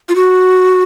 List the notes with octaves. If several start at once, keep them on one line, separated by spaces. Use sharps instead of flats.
F4
F#4